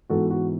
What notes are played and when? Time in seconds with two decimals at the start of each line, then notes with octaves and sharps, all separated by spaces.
0.09 G#2 E3 G#3 B3 F#4 A4
0.30 F#4